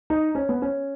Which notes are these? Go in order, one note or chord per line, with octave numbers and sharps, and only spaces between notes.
D#4
C#4
B3
C#4